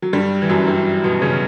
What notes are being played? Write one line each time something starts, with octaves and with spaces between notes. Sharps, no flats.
F#3
G2 G3
E3
F#2 F#3
G2 G3
B2 B3
C#3 C#4